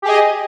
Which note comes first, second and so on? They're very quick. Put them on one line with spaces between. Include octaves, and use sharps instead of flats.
G4 G#4 D#5